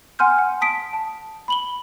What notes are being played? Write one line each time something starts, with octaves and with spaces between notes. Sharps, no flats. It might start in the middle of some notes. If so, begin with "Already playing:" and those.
F#5 G#5 C6 F6 G6
F#5
A5 D#6 B6 D7
A5
B5 F#7 G7